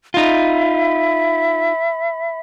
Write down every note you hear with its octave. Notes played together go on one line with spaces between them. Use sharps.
D#4 F4 E5 B5